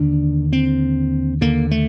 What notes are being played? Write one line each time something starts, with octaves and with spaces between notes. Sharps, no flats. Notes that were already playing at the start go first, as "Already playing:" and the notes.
Already playing: D#2 D3 D4
C4
D#2 D3 A#3
A3